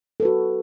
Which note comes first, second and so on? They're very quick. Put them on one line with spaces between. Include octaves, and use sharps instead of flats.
A4 B4 F#4